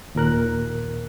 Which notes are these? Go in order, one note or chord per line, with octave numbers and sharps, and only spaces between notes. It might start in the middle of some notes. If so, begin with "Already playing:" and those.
D#2 A#2 A#4 F#6